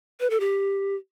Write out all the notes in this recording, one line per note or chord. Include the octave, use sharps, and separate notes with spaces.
B4
A4
G4